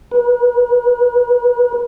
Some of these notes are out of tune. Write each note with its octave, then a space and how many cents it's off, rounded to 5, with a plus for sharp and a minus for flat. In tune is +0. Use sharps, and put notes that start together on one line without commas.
B4 -35